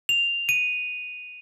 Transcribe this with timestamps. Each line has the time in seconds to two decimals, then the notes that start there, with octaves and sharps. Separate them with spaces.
0.09 F7
0.49 D#7